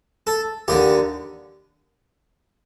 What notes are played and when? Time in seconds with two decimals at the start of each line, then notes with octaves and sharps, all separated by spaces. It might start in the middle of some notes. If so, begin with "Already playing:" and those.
0.27 A4
0.68 D#2 D3 G4